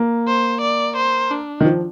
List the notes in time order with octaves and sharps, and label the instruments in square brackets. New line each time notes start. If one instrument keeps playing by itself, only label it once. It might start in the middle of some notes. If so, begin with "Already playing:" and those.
Already playing: [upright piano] A#3
[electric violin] C5
D5
C5
D4
[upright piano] D#3
F3